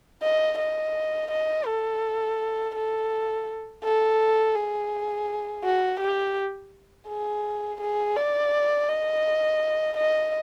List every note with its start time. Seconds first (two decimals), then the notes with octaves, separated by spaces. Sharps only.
0.23 D#5
0.58 D#5
1.31 D#5
1.67 A4
2.75 A4
3.84 A4
4.56 G#4
5.64 F#4
6.00 G4
7.08 G#4
7.80 G#4
8.16 D5
8.89 D#5
9.97 D#5